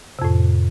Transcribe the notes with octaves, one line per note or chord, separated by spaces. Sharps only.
F2 A2 C3